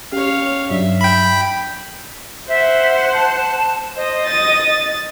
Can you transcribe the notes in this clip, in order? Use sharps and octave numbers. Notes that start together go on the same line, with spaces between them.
C#4 G4 C#5 F5
G2 F#3 D4 E5
G5 B5
C5 E5 F#5
A5
C5 D#5
D#6 A6
A6